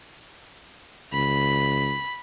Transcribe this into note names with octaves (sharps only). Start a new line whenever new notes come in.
C#2 B5